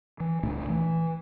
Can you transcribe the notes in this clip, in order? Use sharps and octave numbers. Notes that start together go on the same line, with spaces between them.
E3
C#2 A#2 A3 D4
E3